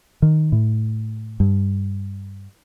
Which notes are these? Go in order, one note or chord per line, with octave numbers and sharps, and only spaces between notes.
D#3
A2
G2